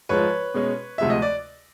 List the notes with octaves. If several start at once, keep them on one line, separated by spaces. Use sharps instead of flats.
G#2 F3 G#3 B4 C#5
B2 G#3 C#4
D2 C3 F3 G#3 E5
D#5
D5